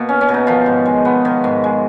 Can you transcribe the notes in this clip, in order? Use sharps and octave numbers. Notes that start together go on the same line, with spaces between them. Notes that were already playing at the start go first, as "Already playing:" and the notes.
Already playing: B2 A#3
C#4
C#4
B2
D#4
D#3 F3 F4
G#2
G#3
B3
D#3
G#2
G#3